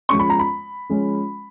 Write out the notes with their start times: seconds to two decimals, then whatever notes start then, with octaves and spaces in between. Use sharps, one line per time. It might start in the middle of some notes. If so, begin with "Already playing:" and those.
0.09 F3 G#3 C#4 C#6
0.19 B5
0.30 A#5
0.39 B5
0.89 F3 G#3 C#4